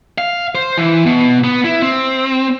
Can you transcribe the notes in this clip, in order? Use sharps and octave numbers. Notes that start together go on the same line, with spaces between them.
F5
C5
E3
B2
B3
E4
C4